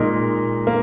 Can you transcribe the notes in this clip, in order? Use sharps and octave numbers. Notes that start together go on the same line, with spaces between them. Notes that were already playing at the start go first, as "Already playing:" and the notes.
Already playing: A#2 G#3 D#4 A#4 D#5
A#3